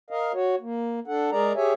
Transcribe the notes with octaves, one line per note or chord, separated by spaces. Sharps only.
A#4 D#5 F5
F#4 C#5
A#3
D4 A4 F#5
G#3 G#4 A#4 D5 A#5
G4 G#4 C#5 E5 G#5